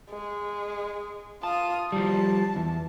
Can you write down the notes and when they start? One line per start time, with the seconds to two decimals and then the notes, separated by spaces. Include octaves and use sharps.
0.10 G#3
1.43 F4 A5 D#6
1.92 F3 G3 A5
2.56 E2